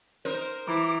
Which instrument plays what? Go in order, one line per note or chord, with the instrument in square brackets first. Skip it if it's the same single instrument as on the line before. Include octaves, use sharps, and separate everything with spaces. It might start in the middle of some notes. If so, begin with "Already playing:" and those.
[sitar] D#4 A#4 C5
[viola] E3 [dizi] A#5 [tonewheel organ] D6